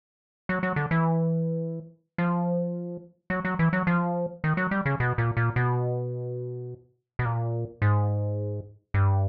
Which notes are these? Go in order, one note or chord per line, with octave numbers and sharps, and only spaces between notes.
F#3
F#3
D3
E3
F3
F#3
F#3
E3
F#3
F3
D#3
F#3
G3
C#3
B2
A#2
A#2
B2
B2
A#2
G#2
G2